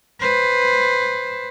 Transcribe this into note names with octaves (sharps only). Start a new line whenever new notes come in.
B4 C5